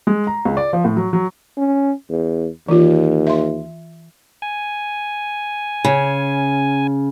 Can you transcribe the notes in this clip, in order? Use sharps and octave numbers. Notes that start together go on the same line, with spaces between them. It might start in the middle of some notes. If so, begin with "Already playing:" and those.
G#3
A#5
C#2
D5
F3
A2
F#3
F#3
C#4
E2
D#2 E3 F4
E5 C6
G#5
C#3